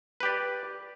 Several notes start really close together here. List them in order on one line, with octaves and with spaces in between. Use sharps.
B4 G4 D5